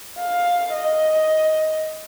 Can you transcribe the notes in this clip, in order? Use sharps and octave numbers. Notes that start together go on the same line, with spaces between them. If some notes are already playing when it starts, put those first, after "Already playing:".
F5
D#5